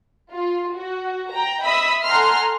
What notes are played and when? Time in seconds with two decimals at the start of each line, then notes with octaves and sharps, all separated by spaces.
0.31 F4
0.75 F#4
1.32 G5 A#5
1.63 D#5 E5 B5 D#6 E6 B6
2.05 A4 F#5 G#5 A#5 C6 F6